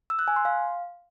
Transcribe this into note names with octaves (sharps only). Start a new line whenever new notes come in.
E6
F#6
G#5
C6
F5